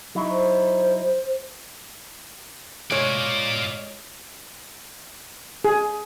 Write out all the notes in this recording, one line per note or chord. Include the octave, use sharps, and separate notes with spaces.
F#3 D#4 E4
C5
G#3 F4 C#5 D5
G#4